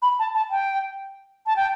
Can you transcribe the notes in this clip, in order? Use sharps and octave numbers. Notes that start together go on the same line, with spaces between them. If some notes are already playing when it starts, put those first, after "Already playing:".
B5
A5
A5
G5
A5
G5